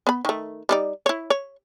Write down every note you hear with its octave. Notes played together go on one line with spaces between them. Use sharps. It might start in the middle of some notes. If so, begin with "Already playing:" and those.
B3 B5
D#3 A3
G3 D#4 D5
E4 C#5
C#5